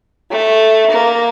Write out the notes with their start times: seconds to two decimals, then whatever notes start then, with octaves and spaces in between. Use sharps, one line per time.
0.30 A3
0.90 A#3